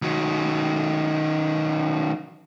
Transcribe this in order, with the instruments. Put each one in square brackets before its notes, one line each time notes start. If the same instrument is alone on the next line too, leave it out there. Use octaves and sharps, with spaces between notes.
[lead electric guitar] D#3 F#3